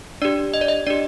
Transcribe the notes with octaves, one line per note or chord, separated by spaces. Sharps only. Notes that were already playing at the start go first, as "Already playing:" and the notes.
D4 G4 D5
D#5
D5
D#5
D4 G4 D5